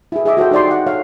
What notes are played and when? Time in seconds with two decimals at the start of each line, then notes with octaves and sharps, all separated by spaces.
0.12 E4 G#4
0.25 G#4 D#5 E5 D6
0.37 F#4 A4 C5 G5
0.51 D#4 G4 D5 G5 C6
0.67 D#5 F#5
0.86 A4 C#5 F5